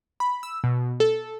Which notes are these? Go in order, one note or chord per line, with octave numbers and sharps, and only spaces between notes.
B5
E6
B2
A4